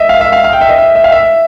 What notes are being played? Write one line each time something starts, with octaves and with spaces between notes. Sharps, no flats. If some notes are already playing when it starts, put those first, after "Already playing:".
Already playing: D#5 E5
F5
E5
F5
F5
G5
E5
D#5
E5
E5
F5
E5